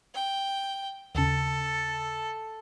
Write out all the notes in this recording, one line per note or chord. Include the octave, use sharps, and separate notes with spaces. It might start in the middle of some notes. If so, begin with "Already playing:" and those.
G5
D#2 C#3 A4